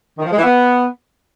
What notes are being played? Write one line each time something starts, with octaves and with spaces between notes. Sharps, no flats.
D#3
F3
G#3
E3
B3